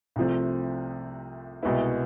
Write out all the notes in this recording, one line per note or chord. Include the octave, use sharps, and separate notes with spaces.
C2 C3 F3 A3 C4
C2 B2 G#3 B3 E4